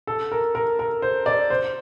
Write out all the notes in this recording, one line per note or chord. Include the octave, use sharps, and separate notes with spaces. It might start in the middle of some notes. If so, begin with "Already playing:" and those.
A4
A#4
A#4
A#4
C5
D5
C5